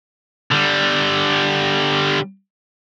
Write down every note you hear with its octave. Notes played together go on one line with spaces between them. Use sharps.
D3 G3